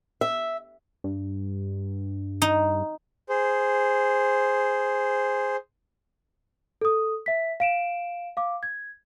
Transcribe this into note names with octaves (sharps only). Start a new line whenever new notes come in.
E5
G2
D#4
G#4 C5
A4 D#6
E5 B6
F5 D7 E7
F5 D6
G#6